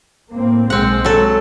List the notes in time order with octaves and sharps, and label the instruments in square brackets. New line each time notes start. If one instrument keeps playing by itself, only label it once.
[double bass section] A2 A#3 C4
[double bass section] B1 G#3 [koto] C4 F#5
[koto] F#3 A4